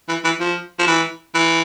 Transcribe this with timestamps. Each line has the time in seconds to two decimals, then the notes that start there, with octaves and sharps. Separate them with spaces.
0.08 E3
0.24 E3
0.40 F3
0.79 F3
0.87 E3
1.34 E3